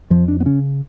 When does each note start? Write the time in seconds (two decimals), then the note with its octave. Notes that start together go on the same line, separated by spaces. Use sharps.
0.10 F2 F3
0.28 D4
0.40 B3
0.45 C#3 C#4